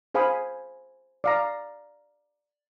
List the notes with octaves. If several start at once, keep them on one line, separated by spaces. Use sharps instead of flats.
G#4 C5 F5 G#5 B5 D#6
D5 F5 A#5